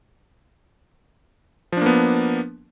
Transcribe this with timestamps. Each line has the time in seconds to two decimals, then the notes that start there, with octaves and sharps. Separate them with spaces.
1.72 F3
1.77 D4
1.82 A#3
1.86 B3